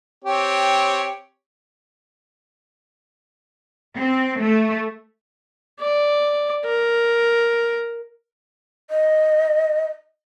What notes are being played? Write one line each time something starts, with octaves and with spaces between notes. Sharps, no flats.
C4 G4 C#5
C4
A3
D5
A#4
D#5